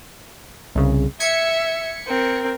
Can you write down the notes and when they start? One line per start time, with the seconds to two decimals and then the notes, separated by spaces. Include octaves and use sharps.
0.75 C2 C#3
1.20 E5 G#6 B6 C#7
2.07 C4 A#4